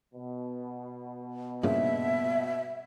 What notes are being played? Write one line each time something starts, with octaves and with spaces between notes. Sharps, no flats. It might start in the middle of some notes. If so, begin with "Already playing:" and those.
B2
G2 A#2 C#3 E5